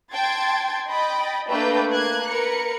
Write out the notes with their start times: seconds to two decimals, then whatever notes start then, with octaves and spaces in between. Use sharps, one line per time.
0.13 G5 A5 C6 G#6 A6
0.90 D#5 G5 B5 A6
1.49 A3 A#3 D4 B4 G5 G6
1.92 A#3 F#6 G#6
2.27 A#4 B4 C#7